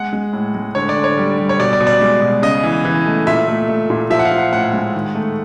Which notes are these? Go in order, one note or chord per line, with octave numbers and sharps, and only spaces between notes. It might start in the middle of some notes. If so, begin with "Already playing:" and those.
Already playing: G#3 F#5
G#3
A2
G#3
D3 C#5
D5
D3
C#5
G3
G3
C#5
B2 D5
D5
B2
D5
G#3
B2
C#3 D#5
E3
E3
A3
A#2 E5
A3
A3
A#2
F3 E5
F#5
F5
F3
F#5
A2 F#5
G#3
D#3
A3